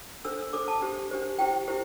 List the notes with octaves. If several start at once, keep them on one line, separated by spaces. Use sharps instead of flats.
D4 A4 C5 E6
E6
D4 A4 C5 D6
A5
D4 G4 C5
D4 G4 C5
E4 G4 C5 G5
E4 G4 C5